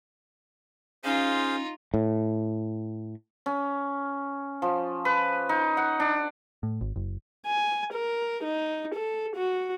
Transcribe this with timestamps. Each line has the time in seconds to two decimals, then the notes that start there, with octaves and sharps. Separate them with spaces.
1.04 C#4 D#4 F4 G#4 C5 F5
1.94 A2
3.46 C#4
4.62 F3
5.05 B4
5.49 D#4
5.77 F#5
6.00 D4
6.63 A2
6.81 G#1
6.96 F#1
7.47 G#5
7.94 A#4
8.44 D#4
8.95 A4
9.37 F#4